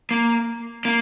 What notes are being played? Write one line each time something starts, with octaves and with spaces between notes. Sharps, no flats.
A#3
A#3